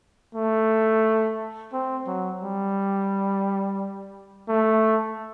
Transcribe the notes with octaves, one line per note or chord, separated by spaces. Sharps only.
A3
C4
F#3
G3
A3